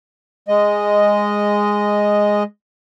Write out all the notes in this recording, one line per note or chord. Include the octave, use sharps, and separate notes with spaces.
G#3 D#5